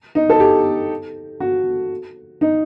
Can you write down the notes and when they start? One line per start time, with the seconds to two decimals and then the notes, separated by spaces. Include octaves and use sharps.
0.15 D#4
0.29 A4
0.40 G4
1.40 F#4
2.41 D#4